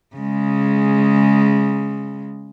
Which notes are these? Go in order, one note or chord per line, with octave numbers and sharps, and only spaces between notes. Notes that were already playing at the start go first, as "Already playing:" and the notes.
C#3 G#3